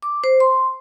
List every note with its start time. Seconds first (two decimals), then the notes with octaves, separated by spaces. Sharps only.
0.02 D6
0.24 C5
0.40 C6